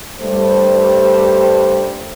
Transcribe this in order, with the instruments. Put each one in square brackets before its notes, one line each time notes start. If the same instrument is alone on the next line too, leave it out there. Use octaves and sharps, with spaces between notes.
[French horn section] G2 G3 A3 C5